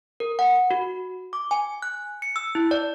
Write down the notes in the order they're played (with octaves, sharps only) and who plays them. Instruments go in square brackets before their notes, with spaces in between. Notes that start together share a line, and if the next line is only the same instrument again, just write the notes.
[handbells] A#4
F#5
F#4
D6
G#5
F#6
C#7
E6
E4
D5